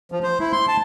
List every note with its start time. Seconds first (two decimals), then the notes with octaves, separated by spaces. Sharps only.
0.12 F3
0.23 C5
0.40 E4
0.52 C6
0.68 A5